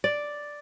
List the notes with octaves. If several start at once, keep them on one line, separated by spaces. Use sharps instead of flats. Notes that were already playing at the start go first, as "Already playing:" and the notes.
D5